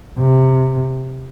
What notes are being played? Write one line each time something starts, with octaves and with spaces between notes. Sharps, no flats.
C3